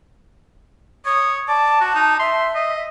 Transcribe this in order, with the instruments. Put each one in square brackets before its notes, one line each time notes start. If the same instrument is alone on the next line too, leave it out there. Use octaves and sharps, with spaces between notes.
[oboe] C#5 [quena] D#6
[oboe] D5 [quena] A5
[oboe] F#4
D#4
[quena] E5 [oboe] C6
[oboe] D#5